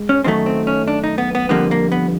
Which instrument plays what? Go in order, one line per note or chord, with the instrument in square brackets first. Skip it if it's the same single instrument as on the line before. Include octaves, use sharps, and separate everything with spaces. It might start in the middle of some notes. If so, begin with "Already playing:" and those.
Already playing: [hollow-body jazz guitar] G#3
C#4
F#2 D#3 F#3 A3 C4
C4
C#4
D4
D#4
B3
B3
F2 D3 G3 A#3 B3
A#3
B3